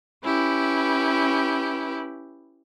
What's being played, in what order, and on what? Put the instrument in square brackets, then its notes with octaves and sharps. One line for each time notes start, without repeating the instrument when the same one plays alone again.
[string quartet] C#4 E4 G4 B4